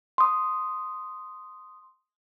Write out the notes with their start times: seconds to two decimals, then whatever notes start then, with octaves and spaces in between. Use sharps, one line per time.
0.18 C6 D#6